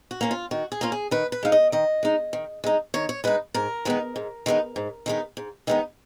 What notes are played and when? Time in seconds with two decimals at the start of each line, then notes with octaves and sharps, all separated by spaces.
0.11 F#4
0.21 A#3 C#4 F4
0.31 F4
0.51 D#3 F#4
0.72 G#4
0.81 A#3 C#4 F4
0.92 G#4
1.11 D#3 B4
1.32 B4
1.43 G#3 D#4 F5
1.52 D#5
1.72 D#3 D#5
2.03 G#3 D#4
2.33 D#3
2.64 G#3 D#4
2.94 D#3 C#5
3.09 C#5
3.24 G#3 D#4 B4
3.54 G#2 A#4
3.85 D#3 G#3 B3 D#4
4.16 G#2
4.46 D#3 G#3 B3 D#4
4.76 G#2
5.06 D#3 G#3 B3 D#4
5.37 G#2
5.67 D#3 G#3 B3 D#4